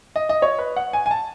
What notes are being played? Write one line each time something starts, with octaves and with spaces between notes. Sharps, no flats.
D#5
D#5
C#5
B4
F#5
G#5
G#5
A5